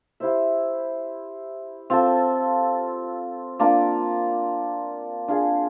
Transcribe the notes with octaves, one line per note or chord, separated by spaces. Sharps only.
E4 G4 C5 E5
C4 F4 A4
A#3 D4 F4 A#4
D4 F4 G#4